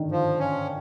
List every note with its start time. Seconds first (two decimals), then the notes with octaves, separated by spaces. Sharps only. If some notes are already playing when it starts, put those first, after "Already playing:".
Already playing: D3 D#3
0.11 F3
0.40 C#4